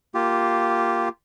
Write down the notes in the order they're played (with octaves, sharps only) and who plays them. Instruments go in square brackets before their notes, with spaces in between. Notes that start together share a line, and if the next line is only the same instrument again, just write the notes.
[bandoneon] A#3 F4 G4